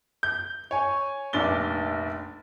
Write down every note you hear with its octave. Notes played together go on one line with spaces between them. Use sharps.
G6
C#5 G#5 C#6
F1 A#1 D4 A6 G7